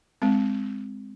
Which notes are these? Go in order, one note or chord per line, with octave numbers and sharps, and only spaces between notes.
G#3 C4